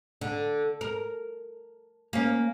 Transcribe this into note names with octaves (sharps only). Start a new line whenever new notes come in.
D3
A#4
A#3 C#4